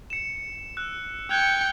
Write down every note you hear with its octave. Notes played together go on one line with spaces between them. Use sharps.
C#7 E7
E6 F#6
G5 F#6 G#6 C#7 F7